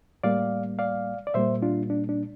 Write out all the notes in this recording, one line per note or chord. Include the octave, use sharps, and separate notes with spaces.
A2 G3 A#3 D5 F5
D5 F5
D5
A#2 G3 A#3 C5 E5
D4 F4
D4
D4